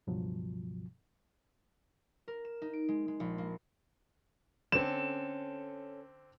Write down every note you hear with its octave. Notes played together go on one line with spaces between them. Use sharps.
C#2 G2 B2 F3 F#3
A#4
E7
D#4
D7
G#3
G#3
A#1
A#3
D3 C4 C#4 A4 E7